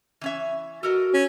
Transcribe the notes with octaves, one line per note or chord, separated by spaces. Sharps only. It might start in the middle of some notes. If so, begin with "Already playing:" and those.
E3 C#4 E5
F#4 A4 A#4 D#5
C#4